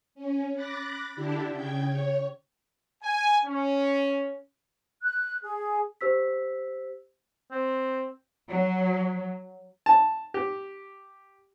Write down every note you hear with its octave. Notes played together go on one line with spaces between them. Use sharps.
C#4
B5 D6 F#6 A6 A#6
D3 D4 E4 G4
C#3 G5 G#6
C#5
G#5
C#4
F#6
G#4
G4 C5 E6 B6
C4
F#3
A5
G4